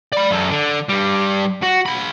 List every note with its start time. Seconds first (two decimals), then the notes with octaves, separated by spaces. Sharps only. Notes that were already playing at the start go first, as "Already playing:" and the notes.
0.13 D5 B5
0.31 F#2 A4
0.50 D3
0.89 G2 G3
1.62 F#4
1.86 F4 B5